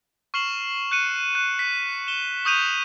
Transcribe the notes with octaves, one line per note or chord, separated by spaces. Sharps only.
C#6 F6 C7 E7 F#7
F#6 C#7 D#7
F#6
B6
E7 G7
C#6 D#6 G6 D#7 F7